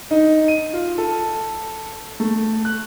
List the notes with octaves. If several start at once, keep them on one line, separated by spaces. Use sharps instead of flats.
D#4
D#7
F4
A4
A3
F#6